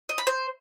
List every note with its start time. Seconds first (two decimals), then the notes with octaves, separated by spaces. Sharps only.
0.09 D#5
0.18 B5
0.27 C5